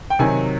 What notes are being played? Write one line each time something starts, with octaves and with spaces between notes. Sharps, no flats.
G5
C3 D#3 F#3 G#5